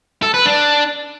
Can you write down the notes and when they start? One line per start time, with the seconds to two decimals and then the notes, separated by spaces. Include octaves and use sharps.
0.22 A4
0.34 B4
0.46 D4